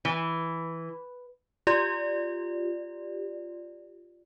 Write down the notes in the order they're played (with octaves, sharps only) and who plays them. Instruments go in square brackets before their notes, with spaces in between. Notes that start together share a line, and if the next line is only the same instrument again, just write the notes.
[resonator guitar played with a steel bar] E3
[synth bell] F4 G4 D5